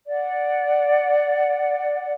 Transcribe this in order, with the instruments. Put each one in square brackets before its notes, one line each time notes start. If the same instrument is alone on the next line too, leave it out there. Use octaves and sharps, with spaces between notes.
[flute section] D5 F#5